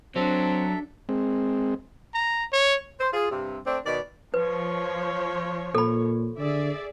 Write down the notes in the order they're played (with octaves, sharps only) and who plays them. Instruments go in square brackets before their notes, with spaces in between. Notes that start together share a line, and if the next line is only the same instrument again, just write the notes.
[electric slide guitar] F#3 [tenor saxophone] C4 [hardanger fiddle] D4 [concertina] A4 E5
[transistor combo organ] G#3 C4
[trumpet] A#5
C#5
[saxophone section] C5
F4 G#4
G2 C3
A3 C4 D4
B2 D#3 D5
[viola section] F3 C#5 [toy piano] B4
[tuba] A#2 [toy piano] A4 B5
[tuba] D3 [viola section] G#4 D5 E5